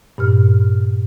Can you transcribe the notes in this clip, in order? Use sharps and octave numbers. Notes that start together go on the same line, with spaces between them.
G2 A#2 F6